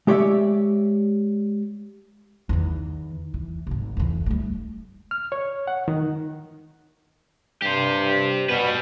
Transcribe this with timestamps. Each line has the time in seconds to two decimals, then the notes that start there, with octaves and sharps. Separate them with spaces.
0.07 G#3 G4 C#5 D5 E5
2.49 E2 D#3
3.34 E3
3.67 D#1 G#1
3.97 F2 E3
4.26 G3 A3
5.11 F6
5.32 C#5
5.67 F#5
5.88 D#3
7.62 G2 G4 C5
8.49 B2 G3 B4